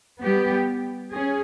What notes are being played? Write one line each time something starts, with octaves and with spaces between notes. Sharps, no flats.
G3 B3 G4
C#4 G#4